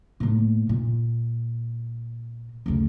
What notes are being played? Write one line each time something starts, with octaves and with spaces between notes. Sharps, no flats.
A2 A#3
A#2
F#1 D2